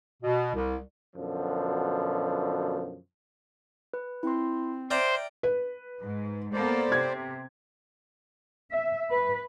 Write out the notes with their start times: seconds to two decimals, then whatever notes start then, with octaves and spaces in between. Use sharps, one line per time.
0.23 B2
0.55 C2
1.15 F#2 B2 D3 F3
3.94 B4
4.23 C4 E4 C6
4.91 C5 D5 E5 G5 A#5 F6
5.43 B4
6.00 G#2
6.53 A#3 B3 A4 C5 D5
6.92 C3 G#6
8.73 E5
9.11 B4